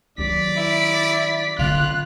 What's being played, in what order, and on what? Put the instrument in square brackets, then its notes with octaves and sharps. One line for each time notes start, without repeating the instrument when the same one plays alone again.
[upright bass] D#3 F#3 [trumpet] D5 [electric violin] B6
[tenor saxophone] E4
[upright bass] D3 C#4 [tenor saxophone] F4 [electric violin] F#6